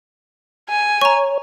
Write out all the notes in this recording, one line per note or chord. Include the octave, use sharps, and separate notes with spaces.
G#5
C#5 A#5 C#6